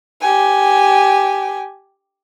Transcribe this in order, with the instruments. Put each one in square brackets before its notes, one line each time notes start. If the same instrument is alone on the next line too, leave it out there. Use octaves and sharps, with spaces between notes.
[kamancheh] G4 G#5